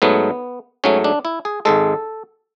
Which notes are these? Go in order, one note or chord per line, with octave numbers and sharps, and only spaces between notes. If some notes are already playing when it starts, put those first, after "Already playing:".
G#2 F#3 A3 B3
G#2 F#3 A3 C#4
D4
E4
G#4
G#1 G#2 G#3 A4